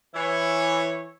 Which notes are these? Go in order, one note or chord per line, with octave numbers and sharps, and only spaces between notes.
E3 E4 C#5